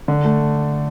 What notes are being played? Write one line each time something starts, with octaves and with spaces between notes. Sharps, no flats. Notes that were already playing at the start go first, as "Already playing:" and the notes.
D3
A3